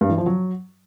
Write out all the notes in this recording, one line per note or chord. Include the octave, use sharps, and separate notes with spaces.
G2
E3
F3
F#3